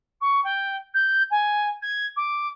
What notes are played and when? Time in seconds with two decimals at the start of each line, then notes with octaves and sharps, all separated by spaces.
0.21 C#6
0.44 G5
0.94 G6
1.30 G#5
1.82 G#6
2.16 D6